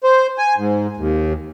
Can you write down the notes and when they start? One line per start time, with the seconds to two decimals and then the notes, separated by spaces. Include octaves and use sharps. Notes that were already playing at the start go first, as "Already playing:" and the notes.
0.04 C5
0.38 G#5
0.57 G#2
0.97 D#2